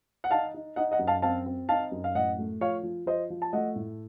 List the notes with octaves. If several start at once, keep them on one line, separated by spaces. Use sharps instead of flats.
F#5
D#4 F5 A5
D#4
D#4 D#5 F#5
D#5 F#5
F#2
F5 A5
C4 F5 A5
C4
D#4 F5 A5
F#2
F5
A2 D#5 F#5
A3
F3 C#5 F5
F3
F3 C5 D#5
F3
A5
A3 D#5 F#5
A2